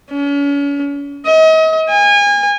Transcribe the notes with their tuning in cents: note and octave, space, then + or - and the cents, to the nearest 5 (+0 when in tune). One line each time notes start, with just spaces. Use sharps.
C#4 +40
D#5 +40
G#5 -30